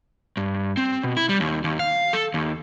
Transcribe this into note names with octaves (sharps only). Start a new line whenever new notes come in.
G2
C4
B2
E4
G3
D#2
D#2
F5
A4
D#2